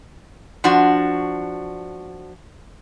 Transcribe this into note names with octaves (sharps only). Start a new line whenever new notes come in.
F3 D4 F#4